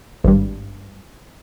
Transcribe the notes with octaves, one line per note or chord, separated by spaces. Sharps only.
G#1 G2